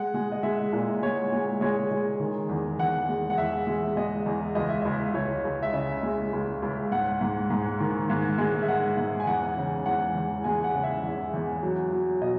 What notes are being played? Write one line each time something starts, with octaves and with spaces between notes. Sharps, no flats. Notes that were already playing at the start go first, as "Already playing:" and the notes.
Already playing: G#3 F#5
G#3
D#5
G#3 E5
A#2
G#3 C#5
G#3
G#3 C#5
G#3
D#3
E2
E2 F#5
G#3
F#5
E2 E5
G#3
G#3 D#5
E2
C#2 D#5
E5
C#2 D#5
C#2 C#5
C#2
E5
C#3 D#5
G#3
C#2
C#2
G#2 F#5
G#2
G#2
D#3
G#2
G#3
E5
G#2 F#5
G#2
G#5
E2 F#5
C#3
E2 F#5
E2
G#3 G#5
F#5
C#3
E5
E2
E2
F#3
F#3
B2 D#5